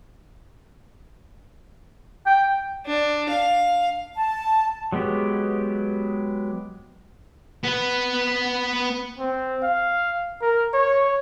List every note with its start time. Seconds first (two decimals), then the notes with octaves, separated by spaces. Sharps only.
2.26 G5
2.86 D4
3.30 F5
4.15 A5
4.92 F#3 G#3 B3 G4
7.64 B3 B4
9.19 C4
9.63 F5
10.42 A#4
10.74 C#5